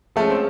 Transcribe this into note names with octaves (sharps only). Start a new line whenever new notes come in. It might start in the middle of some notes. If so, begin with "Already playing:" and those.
F3 G#3 A3 C#4
C4